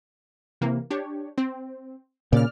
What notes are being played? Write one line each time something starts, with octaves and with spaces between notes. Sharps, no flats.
C3 E3 A#3
D4 G4 C#5
C4
A#2 C#3 D5 F6